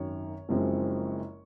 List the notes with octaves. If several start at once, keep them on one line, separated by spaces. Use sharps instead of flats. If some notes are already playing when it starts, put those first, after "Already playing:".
Already playing: G#1 F#2 D#3 C#5
F#1 F#2 F3 G#3 C4